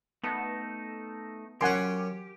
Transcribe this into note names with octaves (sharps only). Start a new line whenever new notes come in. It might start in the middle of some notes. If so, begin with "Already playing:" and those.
A3 B3 D#4 A4
F#2 C#4 G4 F#5 G#5 C6